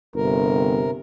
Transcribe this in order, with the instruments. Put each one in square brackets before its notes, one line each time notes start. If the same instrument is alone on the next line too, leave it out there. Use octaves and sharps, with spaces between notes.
[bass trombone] G1 [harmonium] C3 A#4